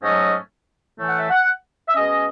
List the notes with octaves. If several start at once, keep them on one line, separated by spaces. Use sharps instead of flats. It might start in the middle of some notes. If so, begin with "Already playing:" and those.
G#2 F#3 A3 C#4 D#5
A2 E3 A3
F#5
E5
F#5
E5
B2 G#3 C#4 D#5